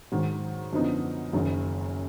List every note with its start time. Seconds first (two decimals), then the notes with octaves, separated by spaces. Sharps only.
0.12 G#2 D#3 F#3
0.73 F#2 D3 F3 B3 D#4
1.33 F#1 F#2 D#3